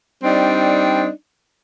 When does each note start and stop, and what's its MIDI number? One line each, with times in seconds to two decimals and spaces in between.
0.24 1.09 55
0.24 1.09 60
0.24 1.09 62
0.24 1.09 63